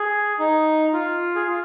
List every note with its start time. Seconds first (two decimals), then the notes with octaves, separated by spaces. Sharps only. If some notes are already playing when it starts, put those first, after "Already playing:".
Already playing: G#4
0.39 D#4
0.93 F4
1.35 G#4
1.47 F4